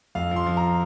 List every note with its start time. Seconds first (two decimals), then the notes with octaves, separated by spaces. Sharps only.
0.15 F2 F5
0.31 F3 C6
0.46 F3
0.57 A#5